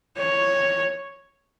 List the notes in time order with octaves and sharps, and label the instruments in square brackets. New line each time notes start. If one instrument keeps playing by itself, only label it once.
[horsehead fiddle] C#5